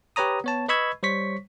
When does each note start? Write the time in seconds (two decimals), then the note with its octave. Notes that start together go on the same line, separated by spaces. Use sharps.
0.16 G4 B4 C#5 A#5 D#6
0.44 B3 C#5 A5
0.69 B4 D#5 B5 C#6 E6 G#6
1.03 G3 C5 C#5 C#6 B6